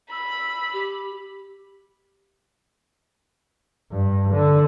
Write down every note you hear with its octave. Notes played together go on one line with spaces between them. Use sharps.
B5 E6
G4
G2
D3